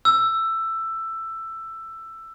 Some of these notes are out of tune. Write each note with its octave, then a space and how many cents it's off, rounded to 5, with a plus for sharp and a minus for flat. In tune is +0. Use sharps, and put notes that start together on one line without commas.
E6 +10